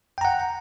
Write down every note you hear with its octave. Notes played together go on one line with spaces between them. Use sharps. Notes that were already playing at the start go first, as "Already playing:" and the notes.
F#5 G5 A#5